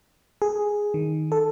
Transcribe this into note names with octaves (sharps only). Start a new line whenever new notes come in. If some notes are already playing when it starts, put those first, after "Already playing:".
G#4
D#3
A4